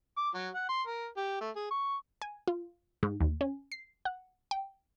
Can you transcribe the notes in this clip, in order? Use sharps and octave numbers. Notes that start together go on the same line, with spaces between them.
D6
F#3
F#5
C6
A#4
G4
A3
G#4
C#6
G#5
F4
G#2
D#2
C#4
C7
F#5
G5